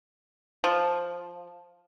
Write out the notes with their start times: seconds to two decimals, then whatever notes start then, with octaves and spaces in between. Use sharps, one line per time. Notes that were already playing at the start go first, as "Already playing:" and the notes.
0.64 F3